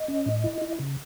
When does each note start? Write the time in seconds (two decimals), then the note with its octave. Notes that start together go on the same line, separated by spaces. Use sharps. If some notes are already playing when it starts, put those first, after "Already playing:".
Already playing: D#5
0.08 C#4
0.26 A2
0.44 E4
0.62 E4
0.80 C#3